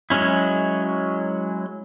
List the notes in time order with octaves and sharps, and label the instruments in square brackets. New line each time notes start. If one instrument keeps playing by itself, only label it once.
[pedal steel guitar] F#3 G#3 C#4 E4